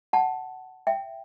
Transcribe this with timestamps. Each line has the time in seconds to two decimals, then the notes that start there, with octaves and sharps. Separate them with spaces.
0.13 F#5 A5
0.87 E5 G5